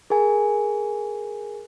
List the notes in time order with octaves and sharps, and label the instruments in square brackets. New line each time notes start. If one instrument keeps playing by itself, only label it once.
[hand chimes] G#4 A#4 G#5